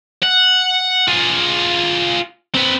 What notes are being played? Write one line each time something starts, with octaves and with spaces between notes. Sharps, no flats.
F#5
F4 G#4
C4 B4